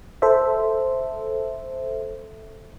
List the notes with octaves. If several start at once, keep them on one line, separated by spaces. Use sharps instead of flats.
A4 C5 E5